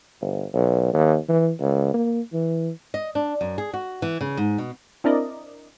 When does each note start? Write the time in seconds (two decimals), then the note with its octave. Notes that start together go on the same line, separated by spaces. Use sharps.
0.21 G1
0.54 B1
0.93 D#2
1.29 E3
1.60 C#2
1.94 A#3
2.33 E3
2.94 D#5
3.15 D4
3.41 F#2
3.58 G#4
3.73 F#4
4.02 E3
4.21 C#3
4.37 G#2
4.58 B2
5.04 C4 D4 E4 A#4 D5 D#5